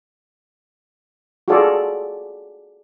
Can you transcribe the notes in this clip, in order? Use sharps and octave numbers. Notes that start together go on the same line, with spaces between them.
F4 F#4 G#4 A4 D5